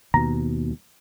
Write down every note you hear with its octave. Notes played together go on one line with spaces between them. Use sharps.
D#2 B2 A#5